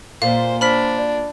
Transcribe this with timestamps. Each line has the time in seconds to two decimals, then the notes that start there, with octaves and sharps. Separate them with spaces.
0.22 A#2 C5 F5
0.61 D4 C5 B5 F6 B6
0.98 D5